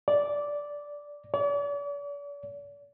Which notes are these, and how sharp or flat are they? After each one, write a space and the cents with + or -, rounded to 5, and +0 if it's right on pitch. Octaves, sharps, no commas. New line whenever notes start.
D5 -10
D5 -45